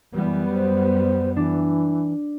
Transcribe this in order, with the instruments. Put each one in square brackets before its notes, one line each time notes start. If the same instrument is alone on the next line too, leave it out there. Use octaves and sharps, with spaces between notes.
[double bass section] F#2 G3 B3 [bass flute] E3
[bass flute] C5
[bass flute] E3 [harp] D4